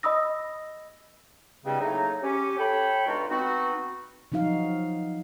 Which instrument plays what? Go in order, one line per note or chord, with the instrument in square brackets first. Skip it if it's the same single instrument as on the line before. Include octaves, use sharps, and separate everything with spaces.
[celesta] D#5 B5 D#6 E6 A#6
[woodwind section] E2 G2 C#3 G3 G#3 C4
A2 C#3 F#3 A#3 D#4
C#4 G4
A4 C#5 G5 B5
G2 B2 G#3 D#4 F4 F#4
B3 C4 D#4 F#4
[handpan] F3 F#3 D#4 F#4 F5